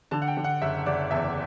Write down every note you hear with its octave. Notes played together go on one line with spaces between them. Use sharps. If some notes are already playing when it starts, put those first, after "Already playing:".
D3 A5
F#5
G5
D3
F#5
F#1 E5
F#1 D5
E2 E5